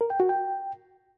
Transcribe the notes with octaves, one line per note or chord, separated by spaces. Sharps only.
A#4
G5
F#4
G5